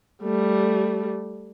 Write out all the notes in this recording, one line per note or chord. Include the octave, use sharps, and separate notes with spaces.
G3 A3